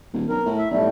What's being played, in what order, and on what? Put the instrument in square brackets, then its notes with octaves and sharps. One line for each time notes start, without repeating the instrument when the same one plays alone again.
[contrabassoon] D#1
[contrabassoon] B1 [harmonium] A#4
[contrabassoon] A2
[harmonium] E5
[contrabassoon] B1 [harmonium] A2 G3 A3